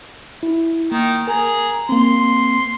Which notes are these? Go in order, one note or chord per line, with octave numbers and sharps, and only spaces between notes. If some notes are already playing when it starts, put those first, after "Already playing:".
E4
D#3 A#3
G#4 A#4 A#5
A#3 C4 C6